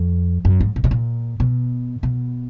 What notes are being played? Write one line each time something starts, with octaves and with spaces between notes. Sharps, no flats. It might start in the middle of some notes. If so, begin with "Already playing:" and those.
Already playing: F2
F#2
G#2
A#2
B2
A#2
B2
B2